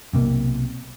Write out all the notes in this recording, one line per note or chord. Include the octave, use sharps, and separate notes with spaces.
B1 C3 A#3